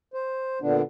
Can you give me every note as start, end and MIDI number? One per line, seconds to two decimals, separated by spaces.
0.14 0.59 72
0.62 0.82 46
0.62 0.82 50
0.62 0.82 59
0.62 0.82 62